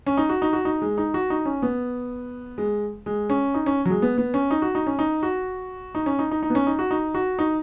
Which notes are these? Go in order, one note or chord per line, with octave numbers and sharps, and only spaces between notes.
C#4
D#4
F#4
D#4
F#4
D#4
G#3
D#4
F#4
D#4
C#4
B3
G#3
G#3
C#4
D#4
C#4
F#3
G#3
B3
B3
C#4
D#4
F#4
D#4
C#4
D#4
F#4
D#4
C#4
D#4
D#4
D#4
B3
C#4
D#4
F#4
D#4
F#4
D#4